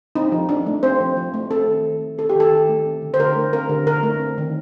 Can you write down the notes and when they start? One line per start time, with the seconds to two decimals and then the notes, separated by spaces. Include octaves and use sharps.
0.15 C4 D#4
0.32 F3
0.49 F3 D4
0.66 A3
0.83 C4 C5
1.00 F3
1.17 F3
1.34 A3
1.51 C4 A4
1.67 D#3
1.84 D#3
2.01 A3
2.18 C4 A4
2.29 G4
2.35 D#3 A4
2.51 D#3
2.69 A3
2.86 C4
3.02 D3
3.14 C5
3.19 D3 A#4
3.36 A3
3.53 C4 A#4
3.69 D3
3.86 D3 A#4
4.03 A3
4.20 C4
4.38 D#3